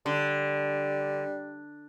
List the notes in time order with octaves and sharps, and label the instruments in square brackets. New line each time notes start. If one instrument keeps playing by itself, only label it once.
[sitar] D3 [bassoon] G3